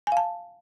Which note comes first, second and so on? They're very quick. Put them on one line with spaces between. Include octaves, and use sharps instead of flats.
G#5 F5 A5